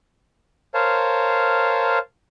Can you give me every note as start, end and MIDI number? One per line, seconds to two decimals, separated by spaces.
0.74 1.99 70
0.74 1.99 72
0.74 1.99 73
0.74 1.99 77
0.74 1.99 81